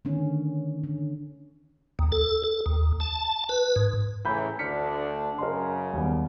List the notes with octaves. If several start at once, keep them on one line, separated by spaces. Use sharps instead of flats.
D3 D#3 C#4
D3
D#2
A4
A4
D#2
A5
B4
G#2
A2 C#3 E3 A#5 B5 G6
D2 D3 D4 F6 B6 C#7
F#2 C#3 A#4 D#5 C6
D#2 G3 B3